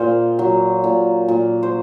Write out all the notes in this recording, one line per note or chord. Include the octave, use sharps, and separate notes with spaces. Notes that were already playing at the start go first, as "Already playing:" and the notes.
Already playing: A#2 C5
F#3
A#2
A#2
C5